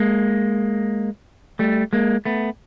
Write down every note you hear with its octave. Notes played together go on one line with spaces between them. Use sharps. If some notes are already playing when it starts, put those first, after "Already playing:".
Already playing: G#3 A#3
G3 A3
G#3 A#3
A3 B3